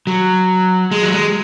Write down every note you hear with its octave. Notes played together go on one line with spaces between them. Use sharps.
F#3
G#3
F#3
G#3